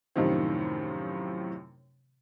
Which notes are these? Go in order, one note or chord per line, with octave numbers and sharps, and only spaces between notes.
F#2 A2 C3 D#3 F3 C4